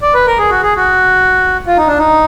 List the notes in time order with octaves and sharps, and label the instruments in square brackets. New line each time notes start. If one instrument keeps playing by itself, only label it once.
[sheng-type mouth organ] D5
B4
A#4
G#4
F#4
G#4
F#4
F4
D#4
D4
D#4